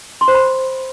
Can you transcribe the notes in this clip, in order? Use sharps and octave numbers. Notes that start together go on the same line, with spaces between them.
C6
C5
B5